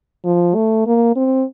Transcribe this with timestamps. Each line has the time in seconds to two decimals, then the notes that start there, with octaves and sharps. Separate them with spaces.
0.25 F3
0.55 A3
0.87 A#3
1.16 C4